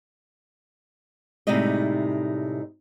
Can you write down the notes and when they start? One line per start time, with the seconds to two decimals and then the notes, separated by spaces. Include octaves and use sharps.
1.47 A2 C3 G3 G#3 D#4 D#5